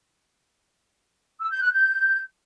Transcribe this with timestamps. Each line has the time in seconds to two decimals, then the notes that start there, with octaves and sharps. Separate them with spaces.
1.39 E6
1.50 G6
1.60 F#6
1.71 G6